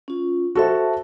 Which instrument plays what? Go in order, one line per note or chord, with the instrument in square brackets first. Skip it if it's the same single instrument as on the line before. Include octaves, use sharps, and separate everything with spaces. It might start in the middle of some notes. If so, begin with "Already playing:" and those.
[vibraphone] C#4 F4
[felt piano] F#4 A4 C5 [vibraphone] E5 A5